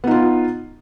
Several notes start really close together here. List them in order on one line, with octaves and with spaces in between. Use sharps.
B3 D#4 F4